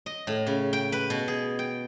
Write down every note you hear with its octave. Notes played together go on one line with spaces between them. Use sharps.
D#5
A2
C#3
G5
B4
B2
G#4
G5